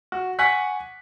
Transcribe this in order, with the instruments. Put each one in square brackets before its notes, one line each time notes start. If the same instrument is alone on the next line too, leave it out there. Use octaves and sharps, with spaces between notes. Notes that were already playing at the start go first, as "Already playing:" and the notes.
[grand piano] F#4
F#5 G#5 C#6 F#6 B6